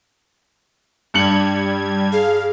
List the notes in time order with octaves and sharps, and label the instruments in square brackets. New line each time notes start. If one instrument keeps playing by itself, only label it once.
[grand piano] G2 C#7 F#7 [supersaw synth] G3 G#6
[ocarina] G#4 [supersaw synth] F5